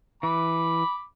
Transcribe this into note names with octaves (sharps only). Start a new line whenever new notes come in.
E3 B5 D6